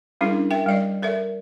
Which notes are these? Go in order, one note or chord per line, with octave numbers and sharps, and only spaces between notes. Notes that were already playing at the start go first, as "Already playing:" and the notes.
G3 C#4 D4 E4 G#4 A#4
A#4 E5 G5
G3 D5 D#5
A4 A#4 D5 E5